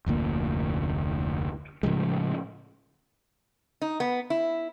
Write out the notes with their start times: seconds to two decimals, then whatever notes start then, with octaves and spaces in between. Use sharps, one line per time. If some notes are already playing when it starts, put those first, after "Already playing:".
0.06 F1 D2 A#2 A#3
1.83 A2 C#3 F3 G#3
3.82 D#4
4.00 B3
4.30 E4